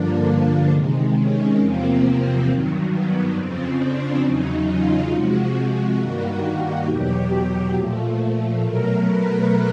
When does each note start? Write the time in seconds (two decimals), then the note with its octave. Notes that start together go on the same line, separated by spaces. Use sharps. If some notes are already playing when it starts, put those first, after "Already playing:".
Already playing: G2 D3 F3 A#3 D4
0.70 C3 D#3 G#3
1.15 C#4
1.58 E2 C3 F3 A#3 C4
2.47 G2 D#3 F#3
2.90 B3
3.34 F2 C#3 F3 C4
3.79 D4
4.23 E2 C#3 F#3 D#4
4.67 F4
5.10 C3 F3 G#3 F#4
5.55 F#4
5.98 G2 D#3 G3 A#3
6.86 E2 B2 F#3 G4
7.75 A#2 F3 A3
8.62 B2 F#3 A3 A#4
9.06 B4